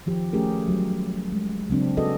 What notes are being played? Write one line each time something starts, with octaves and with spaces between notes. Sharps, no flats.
D#3 F3 G4
A3 C#4 G4 G#4 A#4
F#3 G3
G#3
C#3 F#3 C4 D4
F#4 G#4 A4 B4 D5 D#5